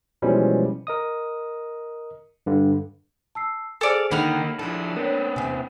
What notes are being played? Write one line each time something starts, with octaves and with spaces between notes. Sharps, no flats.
B2 E3 F3 G3 G#3 C#4
A#4 D#5 D#6
G2 D3
A5 E6 C7
G#4 A4 C5 D5 F5 G#5
D3 D#3 A#3 D#4 F#5 B5 F6
F3 D4 E4 A4
B3 C4 A#4 C#5
E2 C3 G#5